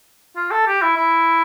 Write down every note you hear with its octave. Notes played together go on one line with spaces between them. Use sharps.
F4
A4
G4
E4
E4